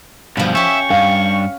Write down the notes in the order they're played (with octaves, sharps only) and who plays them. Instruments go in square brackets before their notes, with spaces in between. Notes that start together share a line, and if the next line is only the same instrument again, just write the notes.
[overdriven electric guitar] G2 B2 [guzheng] F3 B5
[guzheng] C#4 G4 [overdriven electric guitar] E5 [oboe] C#6
[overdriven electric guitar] G2 [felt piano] F5